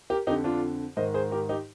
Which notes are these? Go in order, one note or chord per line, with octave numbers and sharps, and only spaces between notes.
G4 A#4
F2 D3 D#4 G4
D4 F4
G#2 D#3 C5 D#5
G#4 C5
G4 A#4
D#4 G4